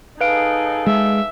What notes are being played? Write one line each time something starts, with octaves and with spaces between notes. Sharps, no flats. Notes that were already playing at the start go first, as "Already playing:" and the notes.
D#4 G#4 A4 B4 F5 D7
G#3 E5